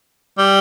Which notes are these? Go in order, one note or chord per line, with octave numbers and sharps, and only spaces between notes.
G3